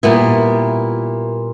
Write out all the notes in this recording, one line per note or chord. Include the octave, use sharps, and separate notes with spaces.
A#2 G3 B3 E4